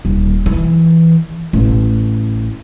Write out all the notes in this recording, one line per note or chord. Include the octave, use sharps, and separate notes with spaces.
D#1
E3
A1